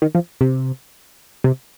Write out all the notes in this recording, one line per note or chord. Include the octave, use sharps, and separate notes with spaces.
D#3
F3
C3
C3